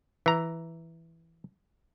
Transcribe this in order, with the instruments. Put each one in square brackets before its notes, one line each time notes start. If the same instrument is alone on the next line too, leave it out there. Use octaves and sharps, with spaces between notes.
[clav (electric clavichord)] E3 A#5